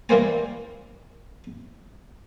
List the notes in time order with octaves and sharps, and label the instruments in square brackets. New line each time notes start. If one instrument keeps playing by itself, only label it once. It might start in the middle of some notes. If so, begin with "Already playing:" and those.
[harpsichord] E3 G3 A#3 C5 G#5